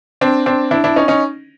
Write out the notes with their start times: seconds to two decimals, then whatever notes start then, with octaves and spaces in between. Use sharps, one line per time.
0.21 C4 D4
0.46 C4 D4
0.71 D4 E4
0.84 D4 E4
0.96 C#4 D#4
1.08 C#4 D#4